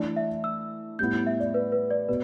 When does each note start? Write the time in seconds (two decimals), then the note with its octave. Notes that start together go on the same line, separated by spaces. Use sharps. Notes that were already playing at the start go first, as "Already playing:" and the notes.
Already playing: E3 A3 D4 D5
0.16 E5
0.44 E6
0.99 A2 G3 B3 E4 G6
1.13 G6
1.27 E5
1.40 D5
1.54 B4
1.72 B4
1.90 D5
2.08 B2 B4